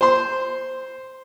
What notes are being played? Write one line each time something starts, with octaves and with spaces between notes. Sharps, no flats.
C5 C6